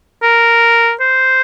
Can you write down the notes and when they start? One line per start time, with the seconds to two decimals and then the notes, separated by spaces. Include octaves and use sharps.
0.22 A#4
1.01 C5